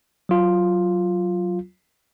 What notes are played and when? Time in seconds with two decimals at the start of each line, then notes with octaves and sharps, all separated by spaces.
0.29 F#3 F4